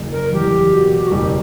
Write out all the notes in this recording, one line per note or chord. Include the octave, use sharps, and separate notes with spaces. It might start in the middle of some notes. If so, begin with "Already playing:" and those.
Already playing: F#1
A#4
E2 G4
B2
F#4
F#1 G4